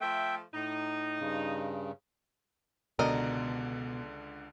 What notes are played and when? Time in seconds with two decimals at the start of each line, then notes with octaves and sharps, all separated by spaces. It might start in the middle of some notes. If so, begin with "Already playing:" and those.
0.01 F3 A3 E5 G5
0.54 A2 D#4
1.20 G2 C#3
2.99 C#2 B2 D3 A#4 D5 D#5